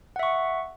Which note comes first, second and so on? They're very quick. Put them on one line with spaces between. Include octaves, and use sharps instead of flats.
F#5 E5 C#6